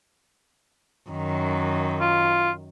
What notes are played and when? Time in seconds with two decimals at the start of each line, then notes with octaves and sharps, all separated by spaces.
1.10 F#2 D#3
2.01 F4